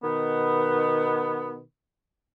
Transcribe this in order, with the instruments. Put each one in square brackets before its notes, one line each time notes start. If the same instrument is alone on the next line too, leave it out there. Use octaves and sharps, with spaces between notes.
[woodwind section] B2 D#3 B3